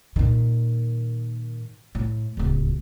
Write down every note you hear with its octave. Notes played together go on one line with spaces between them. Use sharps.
A#2 D#3
A2
D1 C#2